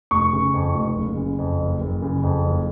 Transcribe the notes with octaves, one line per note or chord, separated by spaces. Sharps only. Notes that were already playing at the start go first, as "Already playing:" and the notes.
F1 C#6
C#3
F2
F1
F#1
C#3
F2
F#1
F#1
C#3
F2
F#1